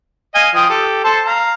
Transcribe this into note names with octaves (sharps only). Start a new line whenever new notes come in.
D#5 F5 G#5
F3 G5 D#6
G4 A4
A4 C5 A5
F5 A#5